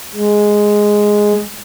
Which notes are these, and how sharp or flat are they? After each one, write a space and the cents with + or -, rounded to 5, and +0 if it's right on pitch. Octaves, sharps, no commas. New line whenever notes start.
G#3 +0